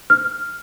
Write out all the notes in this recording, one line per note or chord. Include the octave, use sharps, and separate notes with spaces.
F6